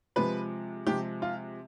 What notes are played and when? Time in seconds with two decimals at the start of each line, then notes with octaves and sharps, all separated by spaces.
0.16 C3 F3 G#3 B4
0.87 C3 F3 G#3 G4
1.22 F4